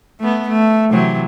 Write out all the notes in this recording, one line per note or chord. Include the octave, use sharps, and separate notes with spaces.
A3 B3
A3
C3 E3 F#3